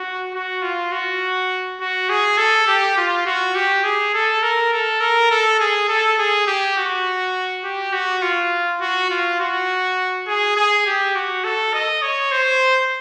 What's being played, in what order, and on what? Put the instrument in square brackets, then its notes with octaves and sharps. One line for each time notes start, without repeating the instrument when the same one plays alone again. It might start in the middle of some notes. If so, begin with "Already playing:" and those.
Already playing: [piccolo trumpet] F#4
F#4
F4
F#4
F#4
G#4
A4
G4
F4
F#4
G4
G#4
A4
A#4
A4
A#4
A4
G#4
A4
G#4
G4
F#4
G4
F#4
F4
F#4
F4
F#4
G#4
G#4
G4
F#4
A4
D#5
C#5
C5